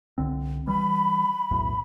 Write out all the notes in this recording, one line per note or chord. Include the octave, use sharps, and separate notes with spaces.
C2 D3 C4
E3 G3 B5
B1 E2 A2